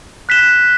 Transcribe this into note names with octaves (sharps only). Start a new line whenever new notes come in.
F#6 B6 E7 G7